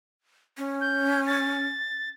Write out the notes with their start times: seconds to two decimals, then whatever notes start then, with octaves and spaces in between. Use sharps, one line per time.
0.58 C#4
0.81 G6
1.27 A6